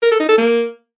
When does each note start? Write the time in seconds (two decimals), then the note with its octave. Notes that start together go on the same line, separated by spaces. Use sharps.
0.02 A#4
0.11 A4
0.20 D#4
0.29 A4
0.38 A#3